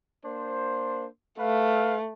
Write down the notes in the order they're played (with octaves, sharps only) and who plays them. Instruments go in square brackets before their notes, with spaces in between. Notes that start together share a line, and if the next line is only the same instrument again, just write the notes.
[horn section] A#3 D4 C5
[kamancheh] A3 [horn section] B4 F5